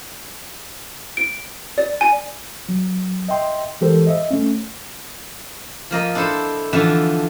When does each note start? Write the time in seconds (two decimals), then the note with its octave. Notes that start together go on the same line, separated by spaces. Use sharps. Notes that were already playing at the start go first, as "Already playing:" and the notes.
1.17 D7
1.78 D5
2.01 G#5
2.69 F#3
3.29 D#5 E5 G5 C6
3.81 E3 G#3 G4 A4 A#4 C5
4.07 D#5 E5
4.31 A3 C#4
5.91 F3 A#3 D#5
6.15 D4 E4 A4 C5
6.73 D3 E3 F3 E5 A5